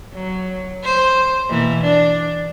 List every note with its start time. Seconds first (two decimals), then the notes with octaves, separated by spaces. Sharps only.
0.14 F#3
0.84 C5
1.50 B2 E3 A#3
1.81 D4